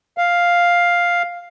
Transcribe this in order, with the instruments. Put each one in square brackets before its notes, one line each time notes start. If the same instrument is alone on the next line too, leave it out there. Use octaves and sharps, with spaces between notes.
[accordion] F5